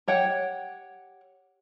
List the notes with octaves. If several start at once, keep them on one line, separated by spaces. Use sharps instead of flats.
G4 C#5 F#5 G5